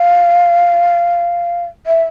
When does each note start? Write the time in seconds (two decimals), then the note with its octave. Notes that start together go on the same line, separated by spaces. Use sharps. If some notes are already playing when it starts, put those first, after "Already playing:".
Already playing: F5
1.87 E5